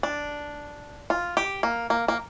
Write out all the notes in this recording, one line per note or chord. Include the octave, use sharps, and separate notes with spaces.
D4
F4
G4
A#3
A#3
A#3